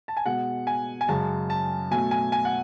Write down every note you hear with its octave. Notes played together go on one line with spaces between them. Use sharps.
A5
G#5
B2 G#3 F#5
G#5
G#5
F#2 C#3 G#3 A5
A5
B2 F#3 A3 G#5
G#5
G#5
F#5